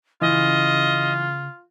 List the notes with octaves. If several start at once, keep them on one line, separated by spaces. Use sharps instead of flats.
C#3 E3 F4 D#5